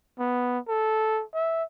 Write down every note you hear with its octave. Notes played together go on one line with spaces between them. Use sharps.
B3
A4
E5